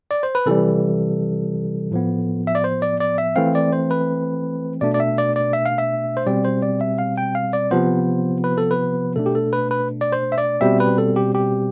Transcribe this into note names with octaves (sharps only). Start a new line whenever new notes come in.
D5
C5
B4
C3 E3 G3 A4
A2 F3 B3
E5
D5
C5
D5
D5
E5
E3 A3 C4 F5
D5
C5
B4
B2 A3 D4 D5
D5
E5
D5
D5
E5
F5
E5
C5
B2 G3 C4 D5
C5
D5
E5
F5
G5
F5
D5
C3 F3 B3 C5
B4
A4
B4
B2 A3 D4 A4
G4
A4
B4
B4
D5
C5
E5
D5
B2 G3 C4 E5
B4
A4
G4
G4